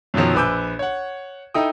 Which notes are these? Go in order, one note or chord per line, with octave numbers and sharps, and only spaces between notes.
F#2 B2 D#3 F3 F#3
A#1 B4 G#5 D6 E6 G6
C#5 F#5
D#4 E4 A4 G5 D#6